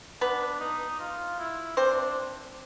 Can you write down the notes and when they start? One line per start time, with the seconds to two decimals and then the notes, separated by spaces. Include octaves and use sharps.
0.21 B3 D4 B4
0.60 D#4
1.00 F4
1.39 E4
1.77 C4 D4 C5